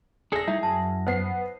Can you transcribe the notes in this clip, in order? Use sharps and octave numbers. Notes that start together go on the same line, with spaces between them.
D4 G#4 A4 A#6
G3 A3 D#4 E4 E5
F#2 A5
B3 C5 F#5 C7